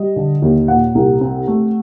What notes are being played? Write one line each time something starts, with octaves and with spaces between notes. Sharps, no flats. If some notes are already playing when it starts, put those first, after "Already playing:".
Already playing: G3 D#5
D3
D#2
A#2 F#5
C2
C4
A3